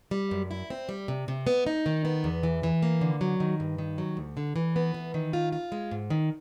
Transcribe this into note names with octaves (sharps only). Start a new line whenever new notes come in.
G3
F#2
E4
C4
G3
C3
C3
B3
D#4
D#3
B3
E2
E3
E3
A#3
D3
F#3
D#3
G2
D#3
F#3
D2
D3
E3
B3
E3
D#3
F4
F4
G#3
G#2
D#3